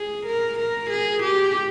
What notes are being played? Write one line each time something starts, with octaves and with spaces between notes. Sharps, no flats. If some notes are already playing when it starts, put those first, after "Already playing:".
Already playing: G#4
A#4
A#4
G#4
G4